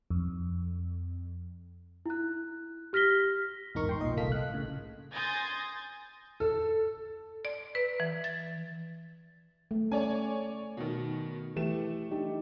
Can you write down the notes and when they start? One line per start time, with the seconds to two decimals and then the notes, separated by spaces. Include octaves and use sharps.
0.10 F2
2.06 E4 F#6
2.93 G4 F6 A#6 B6 G7
3.74 A#1 E2 G#2 D#4 A#4 C#6
3.89 G5 C6
4.01 B1 A#2 D#5
4.17 G1 C2 A#3 A4 F5 B6
4.32 F5 F#6
4.49 A2 C#3
5.14 G#5 C6 D#6 G6 A6 A#6
6.40 A4
7.45 D5
7.75 B4
8.00 E3
8.24 A6
9.71 A3
9.92 C#4 A4 C#5 D5 G#5
10.77 B2 D#3
11.56 E3 A3 G4 E7
12.11 D4 D#4 G4